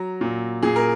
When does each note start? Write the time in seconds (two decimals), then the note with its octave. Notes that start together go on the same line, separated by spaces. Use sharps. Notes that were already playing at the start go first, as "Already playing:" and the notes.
Already playing: F#3 A#5
0.21 A#2
0.63 A#2 G#4
0.76 A#4